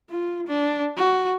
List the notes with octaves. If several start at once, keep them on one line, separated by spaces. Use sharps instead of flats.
F4
D4
F#4